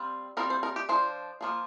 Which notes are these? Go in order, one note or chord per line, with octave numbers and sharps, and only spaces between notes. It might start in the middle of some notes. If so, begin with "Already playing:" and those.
Already playing: G3 C4 F4
G3 C4 F4 A#4
C5
A#4
G4
F3 D4 F4 C5
F3 A#3 F4